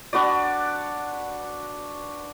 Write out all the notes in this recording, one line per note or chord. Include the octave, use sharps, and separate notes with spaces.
D4 F#4 B4 D5